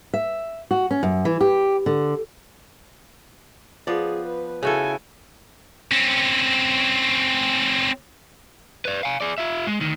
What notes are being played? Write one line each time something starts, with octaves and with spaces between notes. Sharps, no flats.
E5
F#4
C#4
F#2
E3
G4
D3
F3 B3 G#4 D5
B4
C#3 E4 F#4 A4 G#5
C4 C#4
B4 D5
F5 G#5
G#4 D5
F4 E5
G#3
D2 D#3